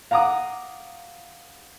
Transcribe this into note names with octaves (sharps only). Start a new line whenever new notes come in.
F5 F#5 A#5 D6 D#6